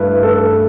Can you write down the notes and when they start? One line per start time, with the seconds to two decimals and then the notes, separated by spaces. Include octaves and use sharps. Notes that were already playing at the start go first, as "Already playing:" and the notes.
Already playing: G2 A3 E4 B4
0.23 A3 A4